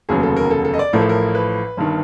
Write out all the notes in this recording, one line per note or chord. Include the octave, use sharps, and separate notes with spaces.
F1 D#2 C#3 F#3 B3 G#4
A4
A#4
A4
A4
D#5
D5
A1 A2 F3 A3 A#4
A4
A#4
B4
G1 G2 D#3